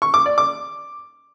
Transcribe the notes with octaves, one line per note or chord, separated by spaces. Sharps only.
C#6
D6
D5
D6